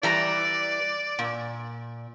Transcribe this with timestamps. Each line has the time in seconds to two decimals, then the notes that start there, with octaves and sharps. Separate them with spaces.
0.03 E3 G3 D5 A#5
1.19 A#2